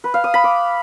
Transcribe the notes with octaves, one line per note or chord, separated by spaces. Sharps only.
B4
F5
D#6
B5
D6